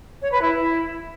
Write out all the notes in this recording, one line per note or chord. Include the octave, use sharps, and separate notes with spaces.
C#5
B4
E4